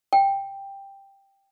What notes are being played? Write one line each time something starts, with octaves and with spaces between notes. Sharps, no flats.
G5